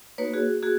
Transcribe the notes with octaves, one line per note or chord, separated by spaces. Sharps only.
A#3 D#4 F#4 B4 C#5
F#4 G#4
A#3 F#4 G#4